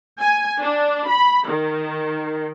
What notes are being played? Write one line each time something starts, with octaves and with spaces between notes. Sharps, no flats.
G#5
D4
B5
D#3